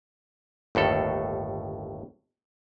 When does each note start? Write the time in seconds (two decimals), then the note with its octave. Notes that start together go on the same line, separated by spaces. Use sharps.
0.75 G1 D#2 A2 A4